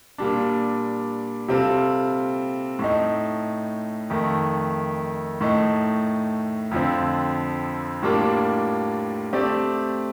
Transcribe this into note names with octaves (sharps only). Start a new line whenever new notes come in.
A#2 G3 D4
C3 G3 C4 F4 A4
A2 A3 D#4
F2 D#3 A3
A2 A3 D#4
F2 D3 F3 C4
A2 G3 A#3 D4 F4
A3 C4 G4 D5